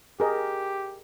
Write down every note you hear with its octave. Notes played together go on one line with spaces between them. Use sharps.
G4 G#4 A#4 D#5